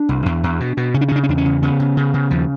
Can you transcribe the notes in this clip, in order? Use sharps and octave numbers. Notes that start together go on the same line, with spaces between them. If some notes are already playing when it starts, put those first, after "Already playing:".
Already playing: D4
C2
E2
E2
B2
B2
C#3 C#4
D4
C#4
C#3 D4
C#4
E2 D4
C#4
C#3
C#3 B3
C#3
C#3
C#3
D#2 F3